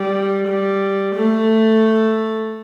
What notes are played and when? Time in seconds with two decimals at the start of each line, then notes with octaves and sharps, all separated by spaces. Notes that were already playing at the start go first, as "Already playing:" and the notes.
Already playing: G3
0.47 G3
1.15 A3